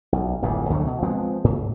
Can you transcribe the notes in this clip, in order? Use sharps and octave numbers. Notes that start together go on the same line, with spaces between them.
B1
D1 A1 F2 A#2
D2 D3 F#3 A3
B2
F3 G#3 B3 C4
G#2